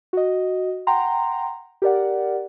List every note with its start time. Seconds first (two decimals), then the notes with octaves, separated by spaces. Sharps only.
0.13 F#4 D#5
0.87 F#5 G5 A#5 C6
1.82 G4 A#4 D5 F#5